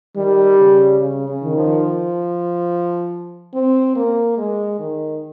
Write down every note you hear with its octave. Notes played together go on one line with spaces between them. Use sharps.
D#3 G3
C#3
C#3
C#3
D#3
F3
C4
A#3
G#3
D#3